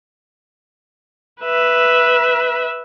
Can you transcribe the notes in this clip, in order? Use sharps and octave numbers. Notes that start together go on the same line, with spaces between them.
B4 E5